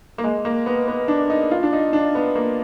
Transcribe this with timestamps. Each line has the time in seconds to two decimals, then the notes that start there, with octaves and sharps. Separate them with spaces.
0.18 A#3
0.24 G#3
0.45 A#3
0.66 B3
0.88 B3
1.08 D4
1.30 D#4
1.51 F4
1.63 D4
1.73 D#4
1.93 D4
2.15 B3
2.35 A#3